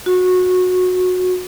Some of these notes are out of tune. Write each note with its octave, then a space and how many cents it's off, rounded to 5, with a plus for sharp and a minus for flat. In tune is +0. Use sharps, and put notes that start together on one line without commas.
F#4 -20